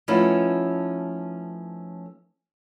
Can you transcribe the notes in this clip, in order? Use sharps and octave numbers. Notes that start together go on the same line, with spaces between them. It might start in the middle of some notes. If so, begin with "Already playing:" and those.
F3 A3 B3 C#4 D#4 E4